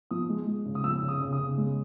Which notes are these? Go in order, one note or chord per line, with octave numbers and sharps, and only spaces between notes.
F3 D#6
G#3
G#3
C#3
D#6
F3 E6
C#3
D#6
C#3
D#6
C#3
G#3